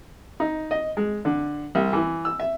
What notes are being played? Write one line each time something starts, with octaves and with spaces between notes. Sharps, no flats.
D#4
D#5
G#3
D3
C2
E3
E6
E5